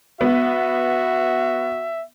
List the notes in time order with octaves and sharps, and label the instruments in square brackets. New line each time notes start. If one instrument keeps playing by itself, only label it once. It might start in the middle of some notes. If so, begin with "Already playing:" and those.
[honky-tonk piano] B3 [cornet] F#4 [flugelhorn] E5